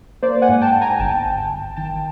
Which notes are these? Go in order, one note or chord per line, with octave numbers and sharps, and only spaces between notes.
A#3 C5 D5
F#5 G#5
G#2
G5 A5
G#2
G#5 A#5
G1 G5 A5
G1
G1
D#3 G5 A5